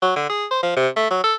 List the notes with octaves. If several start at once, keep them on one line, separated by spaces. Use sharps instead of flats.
F#3
D3
G#4
C5
F3
C3
A3
F#3
A4